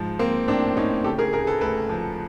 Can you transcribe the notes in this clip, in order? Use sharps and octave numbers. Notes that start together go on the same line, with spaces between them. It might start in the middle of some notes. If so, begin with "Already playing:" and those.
Already playing: G#2 F3
F3 A#3 C4
A2 C4 D4
A2 C#4 D#4
C#3 G4 A4
G#4 A#4
D2 G#4 A#4
A4 B4
D2 A4 B4
F3